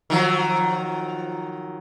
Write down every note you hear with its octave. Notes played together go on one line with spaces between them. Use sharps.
D#3 F3 F#3